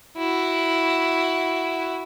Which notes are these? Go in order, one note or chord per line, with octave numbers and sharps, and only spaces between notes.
E4 F#4